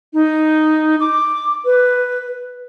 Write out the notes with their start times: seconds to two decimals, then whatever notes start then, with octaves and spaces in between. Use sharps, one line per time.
0.13 D#4
1.00 D6
1.64 B4